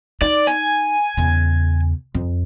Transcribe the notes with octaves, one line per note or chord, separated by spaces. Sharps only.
D#4 D5
G#5
E2 C#3
F2